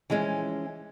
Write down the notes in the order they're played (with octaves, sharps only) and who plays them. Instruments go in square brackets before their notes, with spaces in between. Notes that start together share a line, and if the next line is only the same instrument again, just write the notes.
[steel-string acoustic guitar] E3 F3 G#3 C#4